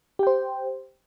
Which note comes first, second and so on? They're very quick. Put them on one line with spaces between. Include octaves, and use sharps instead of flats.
G4 G5 C5